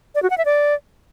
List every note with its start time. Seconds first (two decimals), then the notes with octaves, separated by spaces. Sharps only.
0.15 D5
0.23 F#4
0.30 F#5
0.38 E5
0.45 D5